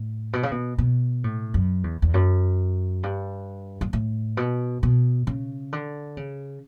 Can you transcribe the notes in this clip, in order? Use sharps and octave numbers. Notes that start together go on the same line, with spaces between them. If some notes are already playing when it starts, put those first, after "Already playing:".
Already playing: A2
B2
C#3
B2
B2
A2
F#2
E2
E2
F#2
G2
G2
A2
B2
B2
C#3
D3
C#3